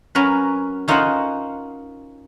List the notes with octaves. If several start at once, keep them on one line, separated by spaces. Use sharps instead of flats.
F#3 C#4 A#4 B4
C#4 D#4 F4 A#4 C5 F#5